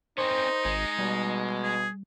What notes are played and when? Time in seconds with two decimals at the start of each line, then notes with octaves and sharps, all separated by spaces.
0.18 C4 C#4 D#4 C5
0.65 G#1 G#3
0.99 B2 G3
1.63 G#4